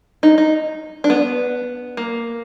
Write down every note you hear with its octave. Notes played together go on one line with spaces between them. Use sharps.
D#4
D#4
D4
B3
A#3